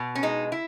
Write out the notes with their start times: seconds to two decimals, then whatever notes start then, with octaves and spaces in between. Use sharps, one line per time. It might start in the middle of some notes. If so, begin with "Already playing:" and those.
Already playing: B2
0.15 C#4
0.23 G#3 D#4
0.52 E4